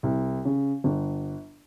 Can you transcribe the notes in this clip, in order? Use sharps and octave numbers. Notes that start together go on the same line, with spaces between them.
C2
C#3
G1